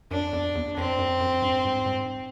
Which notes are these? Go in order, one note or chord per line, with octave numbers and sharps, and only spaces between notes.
F#2 D4
F2
E2
F2 C4
F#2
F#2
G2
G#2
G#2